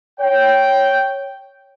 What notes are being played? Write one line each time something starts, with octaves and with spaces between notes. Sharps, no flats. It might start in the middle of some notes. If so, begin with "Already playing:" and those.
C#5 G5